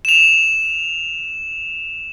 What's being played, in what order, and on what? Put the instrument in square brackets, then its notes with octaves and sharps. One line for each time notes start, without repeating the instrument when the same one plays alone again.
[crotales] E7 F7